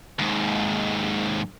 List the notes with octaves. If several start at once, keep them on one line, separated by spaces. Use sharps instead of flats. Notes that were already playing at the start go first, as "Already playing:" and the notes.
D#2 G#2